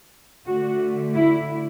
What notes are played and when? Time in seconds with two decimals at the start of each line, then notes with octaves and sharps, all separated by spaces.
0.47 D3 A3 F#4
1.15 E4